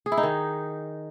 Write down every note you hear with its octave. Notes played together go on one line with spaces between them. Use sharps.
G#4
E4
D#4
D#3